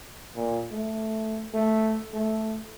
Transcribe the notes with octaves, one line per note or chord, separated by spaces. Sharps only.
A#2
A3
A3
A3